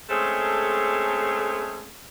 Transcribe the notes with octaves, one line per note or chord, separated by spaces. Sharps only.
G#3 A3 C4 C#4 G#4 A4